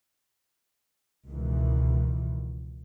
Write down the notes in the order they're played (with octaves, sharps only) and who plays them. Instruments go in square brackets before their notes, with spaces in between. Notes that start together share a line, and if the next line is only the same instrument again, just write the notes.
[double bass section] C#2 B2 D#3 E3